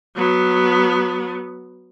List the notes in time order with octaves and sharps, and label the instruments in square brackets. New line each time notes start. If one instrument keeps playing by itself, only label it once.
[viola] F#3 B3